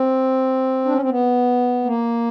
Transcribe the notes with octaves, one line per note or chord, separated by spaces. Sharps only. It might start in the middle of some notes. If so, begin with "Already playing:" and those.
Already playing: C4
D4
C#4
C4
B3
A#3